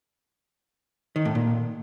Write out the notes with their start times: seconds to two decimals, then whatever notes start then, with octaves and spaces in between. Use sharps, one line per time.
1.16 D#3
1.25 A2
1.35 A#2